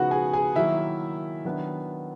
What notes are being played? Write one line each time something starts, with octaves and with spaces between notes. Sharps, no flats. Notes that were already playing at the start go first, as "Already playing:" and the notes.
Already playing: C#3 F3 G#3 B3 D#4 F#4 F#5
G#4 G#5
G#4 G#5
D#3 F#3 A#3 E4 E5
D#3 F#3 B3 D4